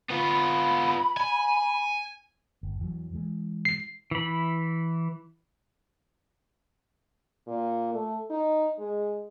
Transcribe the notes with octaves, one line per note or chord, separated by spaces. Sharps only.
B3 F4 B5
G#5
G1
E2 E3 F#3
E3 G#3
C7
E3 B5
A#2
A3
D#4
G#3